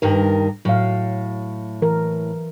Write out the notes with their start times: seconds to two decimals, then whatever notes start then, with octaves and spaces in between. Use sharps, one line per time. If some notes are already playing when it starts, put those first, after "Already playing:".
0.02 G2 D#3 A#4
0.65 A2 F#3 F5
1.82 E3 A#4